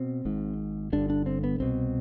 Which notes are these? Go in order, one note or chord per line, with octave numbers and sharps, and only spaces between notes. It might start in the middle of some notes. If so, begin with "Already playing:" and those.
Already playing: B2 C4
G#1 G#2
G1 G2 D3 D4
D4
C4
B3
C2 B2 C4